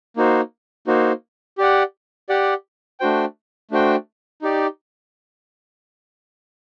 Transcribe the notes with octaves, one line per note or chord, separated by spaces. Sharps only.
A#3 D#4 F#4 C5
A#3 D#4 F#4 C5
G4 D5 F#5
G4 D5 F#5
A3 D4 F#4 C5 G5
A3 D4 F#4 C5 G5
D#4 G4 D5